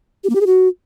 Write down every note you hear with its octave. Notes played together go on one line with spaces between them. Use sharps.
G4
A#3
G4
G#4
F#4